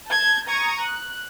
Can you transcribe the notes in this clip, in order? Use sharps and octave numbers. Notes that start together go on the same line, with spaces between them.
A5 G6 G#6
A#5 C#6 D#6 G#6
F#6